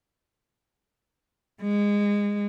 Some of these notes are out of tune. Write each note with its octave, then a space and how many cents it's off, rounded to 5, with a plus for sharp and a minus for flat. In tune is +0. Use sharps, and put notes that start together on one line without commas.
G#3 -20